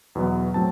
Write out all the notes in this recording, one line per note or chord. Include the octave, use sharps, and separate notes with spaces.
E2 B2 F#3 B3
A2 F#3 C4 A5